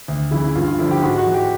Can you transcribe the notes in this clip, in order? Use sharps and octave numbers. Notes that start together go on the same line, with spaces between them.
D2
C#3 E3 E4
E4
G2 F4
F4
D3 F3 E4
G4
G#2 F#4
F#4
E3
G4